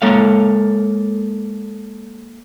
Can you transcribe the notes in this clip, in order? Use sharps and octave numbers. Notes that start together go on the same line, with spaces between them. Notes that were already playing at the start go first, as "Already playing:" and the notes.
G#3 A#3 A4 C#5 F5